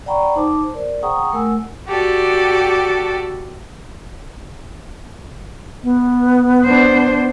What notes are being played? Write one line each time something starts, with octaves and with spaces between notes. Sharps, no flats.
D5 F#5 G5 A#5 B5 C#6
D#4 C5 A5 C6 D6
A#4 C5 D5
G#4 F#5 G5 A#5 C#6 D#6
A3 A#4 F#5 G#5 E6
F#4 G4 A4 D5
B3
D4 C5